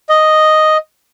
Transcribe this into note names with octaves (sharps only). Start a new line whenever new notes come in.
D#5